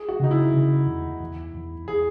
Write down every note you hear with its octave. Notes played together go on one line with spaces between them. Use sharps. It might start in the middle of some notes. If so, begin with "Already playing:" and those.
Already playing: G#4
F#4
C#3 D#4
E4
C#3
E2
E2
E2
G#4